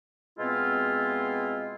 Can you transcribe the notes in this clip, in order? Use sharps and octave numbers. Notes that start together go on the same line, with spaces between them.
B2 G#3 B3 C4 E4 F4